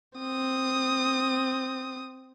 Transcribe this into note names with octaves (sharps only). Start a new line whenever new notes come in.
C4 D#6